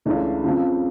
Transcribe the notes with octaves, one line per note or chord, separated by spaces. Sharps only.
C#2 C#3 E3 A3 D4
F2 C#3 F3